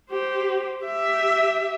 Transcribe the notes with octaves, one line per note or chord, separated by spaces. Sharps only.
G4 C5
G4 E5